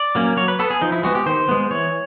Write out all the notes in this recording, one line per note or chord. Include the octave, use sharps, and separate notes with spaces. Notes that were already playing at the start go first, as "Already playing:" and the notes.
Already playing: D5
F#3 A#3 C#4
F#3 C#5
B4
B3 A4
G#4
F3 D#4
E4
G#3 B3 F#4
G4
D#3 C5
G#3 B3
E3 C#5